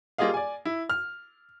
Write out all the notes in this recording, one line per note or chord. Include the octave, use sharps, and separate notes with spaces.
G3 A#3 F4 G#4 D#5 F5
D5 G#5
E4
F6